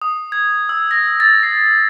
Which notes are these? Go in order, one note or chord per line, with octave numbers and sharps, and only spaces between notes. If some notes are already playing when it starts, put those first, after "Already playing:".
D#6
G#6
E6
A#6
A6
C7